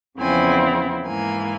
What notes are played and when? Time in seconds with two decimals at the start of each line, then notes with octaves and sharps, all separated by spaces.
0.18 E2 C#3 F3 C4 E4 G#5
1.05 G#2 E3 A#3 G#5